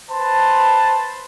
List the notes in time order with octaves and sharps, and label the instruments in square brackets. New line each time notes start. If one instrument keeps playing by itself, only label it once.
[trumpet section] B4 C5 A5